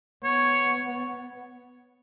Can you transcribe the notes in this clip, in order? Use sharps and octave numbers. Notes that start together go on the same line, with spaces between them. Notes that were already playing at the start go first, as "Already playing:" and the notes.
B3 C#5